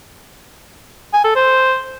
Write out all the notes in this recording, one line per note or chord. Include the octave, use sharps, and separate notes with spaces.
G#5
A4
C5